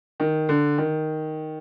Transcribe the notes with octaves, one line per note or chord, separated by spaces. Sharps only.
D#3
D3
D#3